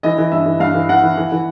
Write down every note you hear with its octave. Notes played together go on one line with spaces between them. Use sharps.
E3 D#5
E3
G2 E5
E3
G2 F5
E3
E3 F#5
E3
E3
E3